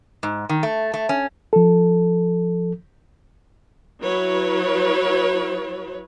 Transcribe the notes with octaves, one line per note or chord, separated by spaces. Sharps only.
G#2
D#3
A3
A3
C#4
F3 A4
F#3 E4 B4 C#5